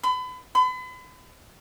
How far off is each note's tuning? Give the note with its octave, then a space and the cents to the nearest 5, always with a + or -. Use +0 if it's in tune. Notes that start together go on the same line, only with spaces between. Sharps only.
B5 +35
B5 +40